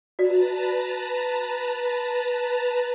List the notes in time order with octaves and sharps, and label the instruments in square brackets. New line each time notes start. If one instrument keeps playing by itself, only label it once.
[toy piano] F#4 D5 [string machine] B4 A5 A#5